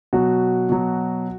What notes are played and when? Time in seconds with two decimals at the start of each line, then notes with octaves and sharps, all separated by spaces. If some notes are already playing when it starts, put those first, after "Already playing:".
0.13 B2 F#3 F#4
0.69 B2 F#3